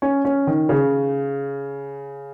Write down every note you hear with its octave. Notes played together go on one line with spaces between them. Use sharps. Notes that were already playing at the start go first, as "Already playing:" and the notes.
C#4
C#4
D#3
C#3